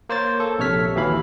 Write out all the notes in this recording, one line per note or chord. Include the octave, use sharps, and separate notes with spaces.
A#3 C5 C#5 A6
A4
A#1 C3 A4 C#5 F6 B6
D#2 E3 F#3 E5 F5 B5